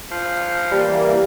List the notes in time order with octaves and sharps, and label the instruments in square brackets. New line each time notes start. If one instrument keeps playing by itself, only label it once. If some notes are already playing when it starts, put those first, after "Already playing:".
[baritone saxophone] F3
[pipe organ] E3 A#3 [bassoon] G3 [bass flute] G4